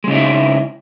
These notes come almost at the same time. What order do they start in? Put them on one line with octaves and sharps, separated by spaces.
G#3 C#3 D#4 E4